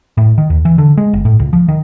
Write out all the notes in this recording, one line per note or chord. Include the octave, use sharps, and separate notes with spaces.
A2
D#3
D#2
E3
D3
G#3
G1
A2
C#2
F3
D#3